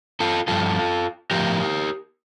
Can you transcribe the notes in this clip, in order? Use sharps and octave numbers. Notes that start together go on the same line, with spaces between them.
F4 A4
G2 F3 F4 A4
A2 F3 G4 A#4